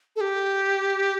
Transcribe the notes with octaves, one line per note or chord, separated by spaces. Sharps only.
A4
G4